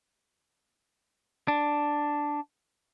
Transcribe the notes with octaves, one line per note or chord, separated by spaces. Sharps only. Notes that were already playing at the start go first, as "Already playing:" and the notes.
D4